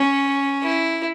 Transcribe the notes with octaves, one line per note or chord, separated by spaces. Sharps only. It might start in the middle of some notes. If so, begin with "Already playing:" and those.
Already playing: C#4
E4